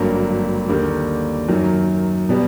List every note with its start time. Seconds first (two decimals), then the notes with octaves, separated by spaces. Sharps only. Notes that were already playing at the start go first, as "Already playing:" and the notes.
Already playing: G#1 G2 D3 F#3 A#3
0.68 D#2 D3 G3 A#3
1.49 F#2 D#3 F#3
2.29 B2 G3 B3